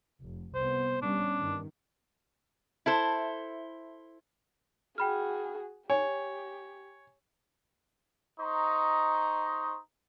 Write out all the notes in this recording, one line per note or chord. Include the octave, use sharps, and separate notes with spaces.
F1
C2 B3 C5
G3 B3 C#4 D4
G2 D#3
E4 A4 C5
F#4 G#4 G5 B5 F6
G4 C#5 G#5
D#4 C5 D#5 A#5 C#6